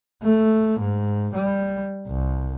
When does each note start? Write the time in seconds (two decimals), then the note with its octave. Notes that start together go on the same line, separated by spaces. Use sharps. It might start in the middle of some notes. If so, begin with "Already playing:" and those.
0.23 A3
0.79 G#2
1.34 G3
2.07 C2